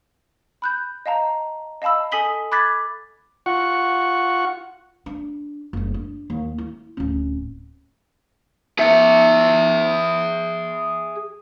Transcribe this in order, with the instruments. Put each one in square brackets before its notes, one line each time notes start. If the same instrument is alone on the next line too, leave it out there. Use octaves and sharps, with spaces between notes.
[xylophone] B5 F#6 G6
D#5 F5 A5 A#5
D#5 F5 A5 B5 E6
A4 G#5 D#6 B6 F#7 G7
B5 D6 F#6 G#6 A6 B6
[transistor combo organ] F4 F#5 C#6
[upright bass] D4
F#1 G2
D4
D#2
E4
D1 C#4
[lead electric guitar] G#4 E5